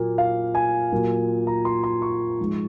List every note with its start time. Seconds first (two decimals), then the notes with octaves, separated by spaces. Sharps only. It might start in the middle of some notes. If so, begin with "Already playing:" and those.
Already playing: A#2 F#3 A#3
0.18 F5
0.55 G#5
0.92 A#2 F#3 A#3
1.47 A#5
1.65 C6
1.84 C6
2.02 C#6
2.40 G#2 F3 G#3